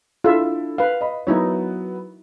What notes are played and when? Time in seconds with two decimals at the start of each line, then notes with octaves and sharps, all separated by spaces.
0.24 D4 E4 F4 A4 E5
0.78 B4 F5
1.01 D#5 B5
1.27 F#3 B3 D#4 E4 C#5